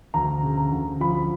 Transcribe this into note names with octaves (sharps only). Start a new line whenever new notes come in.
D2 A#5
C#3
A#5
D2
F3 B5